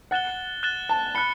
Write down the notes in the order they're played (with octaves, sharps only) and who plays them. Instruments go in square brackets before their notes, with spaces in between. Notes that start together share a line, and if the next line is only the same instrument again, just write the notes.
[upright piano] F#5 [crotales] F#6 A6 E7 G7
[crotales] F#6 A6 E7 G7
[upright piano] A5
[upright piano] B5 [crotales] F#6 C#7 G7